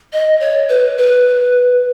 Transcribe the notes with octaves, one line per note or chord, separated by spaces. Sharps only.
D#5
C#5
B4
B4